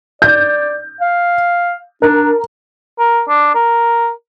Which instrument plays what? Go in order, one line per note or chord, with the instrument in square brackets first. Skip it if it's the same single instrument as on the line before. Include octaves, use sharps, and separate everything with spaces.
[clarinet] D5 [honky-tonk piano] G6
[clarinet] F5
[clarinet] D4 [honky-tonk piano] A#4
[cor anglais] A#4
D4
A#4